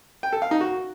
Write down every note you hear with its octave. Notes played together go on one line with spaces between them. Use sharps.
G5
A4
F5
D#4
F#4